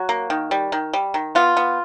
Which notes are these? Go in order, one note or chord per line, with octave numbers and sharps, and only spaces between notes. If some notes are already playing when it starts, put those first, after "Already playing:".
Already playing: F#3 F#4
A#3
D#3
G3
D#3
G3
D#3
B3 F4
B3